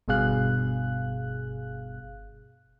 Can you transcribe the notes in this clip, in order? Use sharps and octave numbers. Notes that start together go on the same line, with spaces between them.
G1 G2 B2 G#4 F5 F#6